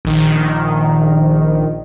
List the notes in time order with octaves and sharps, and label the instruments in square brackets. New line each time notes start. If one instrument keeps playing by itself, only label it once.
[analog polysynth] A#1 D#3